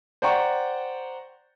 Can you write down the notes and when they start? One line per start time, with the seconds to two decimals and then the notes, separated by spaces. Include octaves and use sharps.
0.22 C5 D5 F#5 G5 A#5 C#6